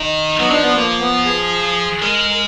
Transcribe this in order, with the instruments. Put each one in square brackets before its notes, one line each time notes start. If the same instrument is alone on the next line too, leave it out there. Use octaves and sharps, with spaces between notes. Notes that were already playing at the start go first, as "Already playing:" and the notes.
Already playing: [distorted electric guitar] D#3 [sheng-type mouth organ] D#4
[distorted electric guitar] F#3 [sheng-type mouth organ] B3
[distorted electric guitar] F3 [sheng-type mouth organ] D4
[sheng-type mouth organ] B3
A#3
B3
G#4
[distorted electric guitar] G#3 [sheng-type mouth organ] A#4
[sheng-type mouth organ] A#4